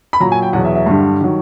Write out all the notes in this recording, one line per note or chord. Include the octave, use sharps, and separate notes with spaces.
B5
A#2 F#3 A#5
G#5
G5
E2 B2 F#3 F#5
E5
E5
G2 D3 G3
D#3 F#3